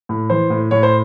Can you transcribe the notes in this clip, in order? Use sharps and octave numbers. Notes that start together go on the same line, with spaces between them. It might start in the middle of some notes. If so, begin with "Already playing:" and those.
A2
E3 C5
A2
A2 C#5
C5